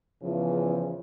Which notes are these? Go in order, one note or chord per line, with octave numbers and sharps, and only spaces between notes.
E2 C#3 F3